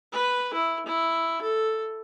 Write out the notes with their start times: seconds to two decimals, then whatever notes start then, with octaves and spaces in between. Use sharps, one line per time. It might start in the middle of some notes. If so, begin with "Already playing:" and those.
0.12 B4
0.54 E4
0.86 E4
1.42 A4